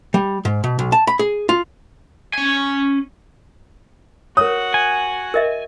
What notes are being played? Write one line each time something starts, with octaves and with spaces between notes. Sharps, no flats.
G3
G#2
B2
B1
A5
B5
G#4
F4
C#4 G#5
F#4 A#4 C#5 F#5 D#6
G#5
A#4 D#5 E5